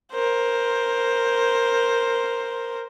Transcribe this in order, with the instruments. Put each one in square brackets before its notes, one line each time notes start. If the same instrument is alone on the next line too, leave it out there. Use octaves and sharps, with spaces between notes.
[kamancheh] A#4 C5